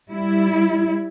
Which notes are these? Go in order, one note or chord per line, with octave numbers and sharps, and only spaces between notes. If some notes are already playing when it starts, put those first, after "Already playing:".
G3 E4